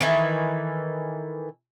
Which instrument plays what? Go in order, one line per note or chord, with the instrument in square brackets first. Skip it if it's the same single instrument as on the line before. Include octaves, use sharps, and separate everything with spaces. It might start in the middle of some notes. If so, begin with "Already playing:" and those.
[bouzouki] D#3 E3 A4